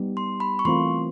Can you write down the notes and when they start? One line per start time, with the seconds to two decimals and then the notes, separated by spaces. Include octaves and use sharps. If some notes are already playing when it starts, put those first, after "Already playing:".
Already playing: G3 B3 D#4 G4
0.17 C6
0.40 B5
0.59 C#6
0.65 E3 A3 C4 F4 A#4 C6